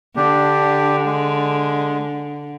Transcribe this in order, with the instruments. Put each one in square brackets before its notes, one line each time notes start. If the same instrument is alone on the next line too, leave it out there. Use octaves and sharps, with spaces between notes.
[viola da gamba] D3 [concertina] D4 G4
[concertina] G#3